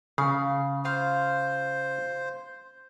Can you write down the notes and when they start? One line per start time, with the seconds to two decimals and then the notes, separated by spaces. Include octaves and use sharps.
0.18 C#3 F5
0.85 F4 C5 F5